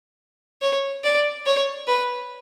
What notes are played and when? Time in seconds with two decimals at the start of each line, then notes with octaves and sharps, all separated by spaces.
0.62 C#5
1.04 D5
1.46 C#5
1.88 B4